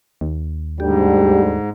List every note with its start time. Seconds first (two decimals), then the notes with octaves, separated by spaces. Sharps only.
0.21 D#2
0.80 D2 G#2 D3 G3 G4